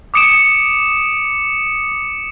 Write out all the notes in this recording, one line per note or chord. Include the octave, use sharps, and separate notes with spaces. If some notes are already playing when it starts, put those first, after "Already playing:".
D6 D#6 C#7 D7 E7